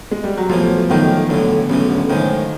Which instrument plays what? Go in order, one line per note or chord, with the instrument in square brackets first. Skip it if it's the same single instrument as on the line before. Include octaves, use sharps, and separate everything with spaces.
[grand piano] G#3
G3
F#3
[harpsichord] B1 A2 E3 [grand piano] F3
[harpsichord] B1 A2 E3 [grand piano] D#3
[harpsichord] B1 A2 E3 [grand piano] D3
[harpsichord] B1 A2 E3 [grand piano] C#3
[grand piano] D3
[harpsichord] A2 F3 G#3 [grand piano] D#3